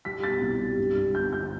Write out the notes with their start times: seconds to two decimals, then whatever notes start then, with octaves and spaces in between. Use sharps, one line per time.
0.05 G3 B6
0.23 B2 A6
0.41 C2
0.60 G3
0.78 G2
0.97 G2
1.15 G1 G6
1.33 G1 G6